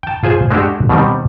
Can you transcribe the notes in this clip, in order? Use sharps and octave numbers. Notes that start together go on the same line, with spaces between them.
G5 A5
F4 G#4 C5 G#5
G#3 A3 D4 F#4 G4
B2 D#3 G3 C4